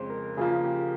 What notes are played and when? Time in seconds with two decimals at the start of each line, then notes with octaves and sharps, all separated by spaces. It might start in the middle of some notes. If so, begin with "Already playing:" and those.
Already playing: F2 C#3 G#3 C5
0.10 A#4
0.37 C#3 F3 A#3 G#4
0.64 G4